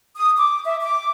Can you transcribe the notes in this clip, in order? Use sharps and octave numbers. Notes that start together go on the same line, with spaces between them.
D#6
D6
E5
D6